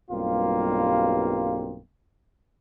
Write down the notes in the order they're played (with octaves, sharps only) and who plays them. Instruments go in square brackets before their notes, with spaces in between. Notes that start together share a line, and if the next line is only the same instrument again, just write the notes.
[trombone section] B1 G2 G3 A#3 C4 F4